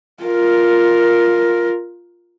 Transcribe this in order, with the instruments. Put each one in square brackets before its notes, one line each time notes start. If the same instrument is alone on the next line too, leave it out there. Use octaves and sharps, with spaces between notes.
[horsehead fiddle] F4 A#4